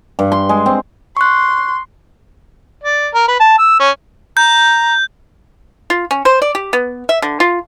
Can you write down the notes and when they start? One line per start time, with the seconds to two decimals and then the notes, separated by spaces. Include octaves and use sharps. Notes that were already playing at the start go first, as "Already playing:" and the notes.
0.19 G2
0.32 C6
0.49 G#3
0.66 C4
1.17 C6 C#6 F#6
2.84 D5
3.14 A#4
3.28 B4
3.40 A5
3.59 E6
3.80 C#4
4.37 A#5 G6
5.90 F4
6.11 C#4
6.25 C5
6.42 D5
6.55 G4
6.73 B3
7.09 E5
7.22 D3
7.40 F4